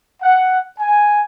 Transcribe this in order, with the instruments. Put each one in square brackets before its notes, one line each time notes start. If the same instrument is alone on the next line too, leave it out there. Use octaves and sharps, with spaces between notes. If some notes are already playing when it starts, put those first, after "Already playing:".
[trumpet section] F#5
G#5